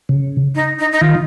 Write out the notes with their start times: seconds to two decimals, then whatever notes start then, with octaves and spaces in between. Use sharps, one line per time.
0.09 C#3
0.55 D#4
0.79 D#4
0.92 D#4
1.01 D#3 F4